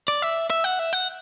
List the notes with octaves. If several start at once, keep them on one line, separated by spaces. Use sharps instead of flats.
D5
E5
E5
F#5
E5
F#5